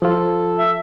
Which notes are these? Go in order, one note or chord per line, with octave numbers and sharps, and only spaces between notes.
F3 F4 A4
E5